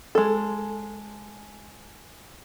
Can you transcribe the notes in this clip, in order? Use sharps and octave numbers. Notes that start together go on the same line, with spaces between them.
G#3 A4